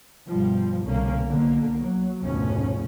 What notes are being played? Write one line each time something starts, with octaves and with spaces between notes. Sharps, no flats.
G2 B2 F3 G3
C2 B2 D3 A#3 C#4
B1 B2 D3 A#3
F#3
F1 D2 G#2 B2 F3 C#4